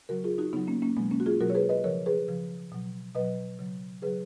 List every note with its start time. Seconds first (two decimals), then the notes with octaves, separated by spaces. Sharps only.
0.09 C#3 F#3 F#4 A#4
0.24 F4 G#4
0.38 D#4 F#4
0.53 C#3 F#3 B3 D#4
0.67 A#3 C#4
0.82 A#3 C#4
0.97 B2 F#3 G#3 B3
1.11 A#3 C#4
1.20 F#4
1.26 F4 G#4
1.40 B2 F#3 F#4 A#4
1.50 C#5
1.55 G#4 B4
1.69 B4 D#5
1.84 C#3 F3 A#4 C#5
2.06 G#4 B4
2.28 C#3 F3
2.72 B2 F#3
3.15 B2 F#3 B4 D#5
3.59 C#3 F#3
4.02 C#3 F#3 G#4 B4